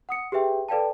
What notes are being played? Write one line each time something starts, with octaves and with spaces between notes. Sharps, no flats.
F#5 D#6 C#7
G4 G#4 B4 E5 G5
A4 B4 D5 F5 G5 A5